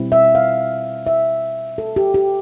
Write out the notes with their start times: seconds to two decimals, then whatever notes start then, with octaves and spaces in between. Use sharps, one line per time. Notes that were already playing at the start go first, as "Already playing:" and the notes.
Already playing: B2 G3 C4 E4
0.12 E5
0.35 F5
1.07 E5
1.78 A4
1.96 G4
2.14 G4